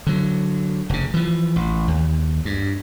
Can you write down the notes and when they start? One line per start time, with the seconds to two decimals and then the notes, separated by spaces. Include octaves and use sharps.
0.07 D3 F#3
0.89 F1 C#3
1.14 E3 F3
1.56 A1
1.88 D#2
2.45 G2